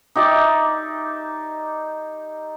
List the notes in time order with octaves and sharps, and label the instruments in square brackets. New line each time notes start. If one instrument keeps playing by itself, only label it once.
[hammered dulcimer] D#4 G4 D5 E5